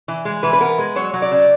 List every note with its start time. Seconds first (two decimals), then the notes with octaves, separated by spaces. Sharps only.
0.08 E3
0.25 G#3
0.43 E3 B4
0.53 B4
0.60 B3 A#4
0.78 G#3
0.96 F#3 C#5
1.14 F#3
1.22 D5
1.31 C#3